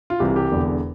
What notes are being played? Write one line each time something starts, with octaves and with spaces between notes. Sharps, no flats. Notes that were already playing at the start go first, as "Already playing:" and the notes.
F4
C2 C3 E3 G4
G4
E1 E2 D3